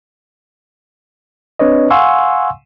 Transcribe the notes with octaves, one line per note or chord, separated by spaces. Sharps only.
C4 D4 B4 C#5 D#5
F5 F#5 G#5 C6 C#6 E6